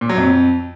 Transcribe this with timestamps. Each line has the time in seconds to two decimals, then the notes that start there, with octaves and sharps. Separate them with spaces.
0.01 A#2
0.09 F#3
0.18 F2